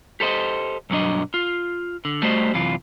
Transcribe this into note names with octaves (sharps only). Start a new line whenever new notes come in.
G4 A4 C5 D5 D#5
B1 G2 F#3 D4 D#5
F4
D3
G3 A3 F#4 C5 D#5
F#2 C3 E3 F4